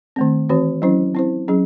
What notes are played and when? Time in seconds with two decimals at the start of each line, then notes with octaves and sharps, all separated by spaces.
0.16 D#3 A3 C4
0.50 E3 C4 F#4 C#5
0.82 F#3 C#4 E4 C5
1.15 C4 E4 C5
1.48 F#3 C#4 G#4